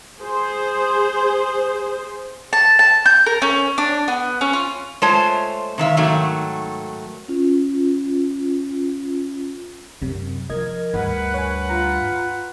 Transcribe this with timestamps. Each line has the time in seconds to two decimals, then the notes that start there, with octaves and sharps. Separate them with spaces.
0.22 G#4 C5
2.53 A5
2.79 A5
3.06 G6
3.26 A#4
3.42 C#4
3.78 D4
4.08 B3
4.41 C#4
4.53 F4
5.02 G#3 A3 F4 C5 C#5 A5
5.78 C3 D#3 E5 F5
5.97 G#2 D#3 F#3 A3
7.28 C#4 F4
10.02 F#2 C3
10.50 F3 A#4 D#5 G#6
10.94 D2 G2 B4 F#5
11.34 C#5 G#5
11.69 F4 A#5